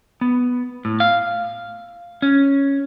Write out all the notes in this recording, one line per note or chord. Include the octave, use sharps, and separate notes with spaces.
B3
A2
F5
C#4